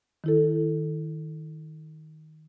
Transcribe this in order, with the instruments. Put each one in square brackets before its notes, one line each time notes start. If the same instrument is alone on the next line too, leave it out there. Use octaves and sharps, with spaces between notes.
[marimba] D#3 E4 A4